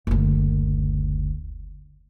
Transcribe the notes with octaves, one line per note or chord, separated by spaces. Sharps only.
F#1 D2